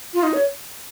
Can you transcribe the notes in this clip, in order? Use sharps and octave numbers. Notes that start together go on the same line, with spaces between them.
F4
D#4
C#5